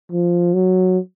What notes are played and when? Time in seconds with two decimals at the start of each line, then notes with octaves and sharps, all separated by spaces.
0.12 F3
0.54 F#3